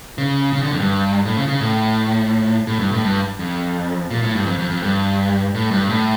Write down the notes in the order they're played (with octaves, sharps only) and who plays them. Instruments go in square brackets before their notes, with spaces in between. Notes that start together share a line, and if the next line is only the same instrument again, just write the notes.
[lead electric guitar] C#3
C#3
D3
F2
G2
A2
C#3
C#3
A2
A2
G2
A2
G2
F2
A#2
A2
G2
F2
F2
F2
G2
A2
G2
A2